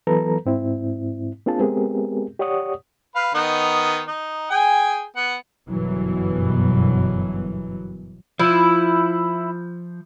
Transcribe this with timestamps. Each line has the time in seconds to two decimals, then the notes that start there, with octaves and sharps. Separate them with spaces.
0.07 E3 F#3 B3 A4 B4 A#5
0.46 G#2 C4 E4
1.46 A#3 C4 D4 F4 G#4 A5
1.60 G#3 B3 C4 G4 G#4 A#4
2.39 G4 C#5 D5 F#5 C#6 D#6
3.15 B4 F5
3.34 D#3 B3 D#4
4.08 D#4
4.50 G#4 G5 G#5
5.16 B3 F#5
5.69 G1 F#2 B2 E3 F#3
8.39 F3 E4